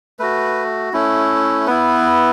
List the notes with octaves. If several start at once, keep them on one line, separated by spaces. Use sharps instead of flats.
A3 F#4 B4
A3 C#4 E4
B3 E4 B4